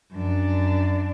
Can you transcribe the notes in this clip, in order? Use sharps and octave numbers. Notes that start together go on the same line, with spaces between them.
F#2 D4